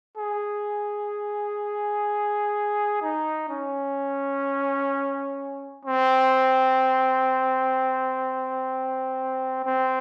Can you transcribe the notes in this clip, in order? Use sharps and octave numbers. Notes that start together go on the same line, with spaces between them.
G#4
D#4
C#4
C4
C4